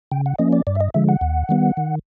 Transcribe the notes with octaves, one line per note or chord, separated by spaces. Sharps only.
C#3 G5
F#5
F3 A#3 C#4 D#5
D5
G2 D5
E5
D#5
D3 F3 G#3 E5
F#5
D#2
D#3 G3 B3
D#3